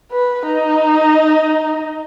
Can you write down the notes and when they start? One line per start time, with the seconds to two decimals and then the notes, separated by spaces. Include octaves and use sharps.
0.12 B4
0.47 D#4